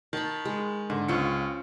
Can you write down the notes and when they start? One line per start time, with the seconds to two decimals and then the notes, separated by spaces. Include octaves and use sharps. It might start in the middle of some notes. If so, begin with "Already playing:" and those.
0.13 D#3 A5 B5
0.45 G#3
0.90 G#2 D3
1.08 C#2 C#4 F4 C5 C#7